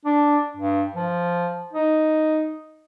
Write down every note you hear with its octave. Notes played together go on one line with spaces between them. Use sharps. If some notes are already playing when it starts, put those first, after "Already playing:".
D4
G2
F3
D#4